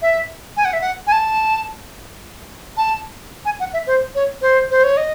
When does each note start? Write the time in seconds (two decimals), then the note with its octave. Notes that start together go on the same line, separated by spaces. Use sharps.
0.02 E5
0.57 G#5
0.65 F#5
0.73 E5
0.81 F#5
1.07 G#5
1.12 A5
2.77 A5
3.45 G#5
3.60 F#5
3.73 E5
3.87 C5
4.15 C#5
4.42 C5
4.71 C5
4.84 C#5
4.97 D#5